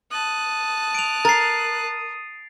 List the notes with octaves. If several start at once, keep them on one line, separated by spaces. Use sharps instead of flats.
A5 D#6 F#6
D7 F7
A#4 A6 C7